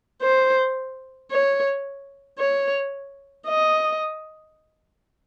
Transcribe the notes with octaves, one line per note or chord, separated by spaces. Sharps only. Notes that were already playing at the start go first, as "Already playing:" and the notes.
C5
C#5
C#5
D#5